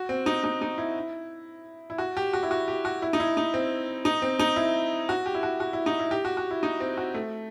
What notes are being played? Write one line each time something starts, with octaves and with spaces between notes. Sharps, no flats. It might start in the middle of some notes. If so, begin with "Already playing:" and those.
Already playing: F#4
C4
D#4
D#4
D#4
E4
E4
F#4
G4
F#4
E4
F#4
G4
F#4
E4
D#4
E4
D#4
C4
D#4
C4
D#4
E4
F#4
G4
E4
F#4
F#4
E4
D#4
E4
G4
F#4
F#4
E4
D#4
C4
F#4
A3